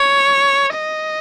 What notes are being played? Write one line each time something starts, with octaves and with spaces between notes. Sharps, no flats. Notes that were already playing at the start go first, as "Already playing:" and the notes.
Already playing: C#5
D#5